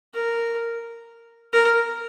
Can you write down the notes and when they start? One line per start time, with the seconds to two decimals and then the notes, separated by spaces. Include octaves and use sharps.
0.14 A#4
1.53 A#4